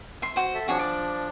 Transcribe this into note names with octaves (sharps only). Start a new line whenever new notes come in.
E5 C6
F#4 C5
A4 E5
F3 D4 F#4 G#4 C#5
D5